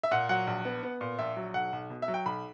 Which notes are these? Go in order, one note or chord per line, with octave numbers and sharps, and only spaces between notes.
E5
A#2 F#5
F#3 F#5
A#1
B3
B3
A#2
A#1 E5
F#3
B1 F#5
B1
B2
E5
F#3
G5
B1 B5